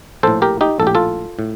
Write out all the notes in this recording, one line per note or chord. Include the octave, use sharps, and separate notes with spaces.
A#1 A2 A4 C5
G4 A#4
D#4 G4
A#1 A2 G4 A4
F4 A4
A2